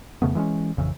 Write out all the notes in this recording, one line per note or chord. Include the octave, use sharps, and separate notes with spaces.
F2 C#3 A3 B3
E3 G#3 C4 C#4
A1 F2 C#3 E3